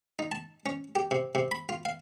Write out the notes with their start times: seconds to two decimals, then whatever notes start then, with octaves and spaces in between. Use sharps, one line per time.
0.19 D#4
0.32 A5
0.66 C#4
0.95 G4
1.11 C3
1.35 C3
1.51 B5
1.69 F4
1.85 F5